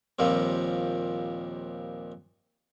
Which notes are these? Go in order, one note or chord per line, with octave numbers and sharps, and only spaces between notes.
D#2 A#2 F3 G3 C4